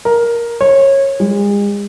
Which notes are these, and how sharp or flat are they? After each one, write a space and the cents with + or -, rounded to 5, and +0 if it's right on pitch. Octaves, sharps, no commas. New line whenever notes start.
A#4 +10
C#5 -20
G#3 -40